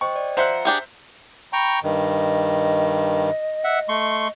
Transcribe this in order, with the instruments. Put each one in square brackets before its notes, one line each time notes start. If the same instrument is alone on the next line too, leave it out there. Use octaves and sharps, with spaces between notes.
[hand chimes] C5 D#5 G5 [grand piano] C#6
[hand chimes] D5
[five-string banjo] F3 [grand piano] C5 E5 F#6 [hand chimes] F#5 A#5 C#7
[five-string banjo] D4 G4 G#4
[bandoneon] G5 A#5 C#6 [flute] B5
[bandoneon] G2 D#3 [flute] D#5
[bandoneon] E5 F#5
A3 C6 C#6